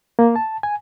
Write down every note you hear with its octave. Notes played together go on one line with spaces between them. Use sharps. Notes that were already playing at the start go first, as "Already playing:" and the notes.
A#3
A5
G#5